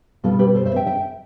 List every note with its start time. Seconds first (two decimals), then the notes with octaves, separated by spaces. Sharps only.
0.24 B2 G3 B3 E4 F4 A4
0.39 G4 B4
0.55 A4 C5
0.66 C5 E5
0.76 E5 G5
0.86 E5 G5